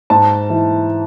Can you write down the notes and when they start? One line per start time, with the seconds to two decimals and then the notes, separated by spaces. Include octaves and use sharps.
0.10 G#2 A5
0.50 E3